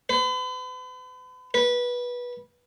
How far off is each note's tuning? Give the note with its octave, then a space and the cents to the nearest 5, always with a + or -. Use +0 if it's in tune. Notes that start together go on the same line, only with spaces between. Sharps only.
B4 +40
B4 -20